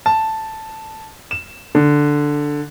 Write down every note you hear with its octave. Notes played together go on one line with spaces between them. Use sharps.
A5
E7
D3